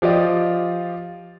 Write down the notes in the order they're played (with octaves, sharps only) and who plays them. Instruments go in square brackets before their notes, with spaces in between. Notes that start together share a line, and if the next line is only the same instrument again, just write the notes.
[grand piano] F3 F4 G4 D5 D#5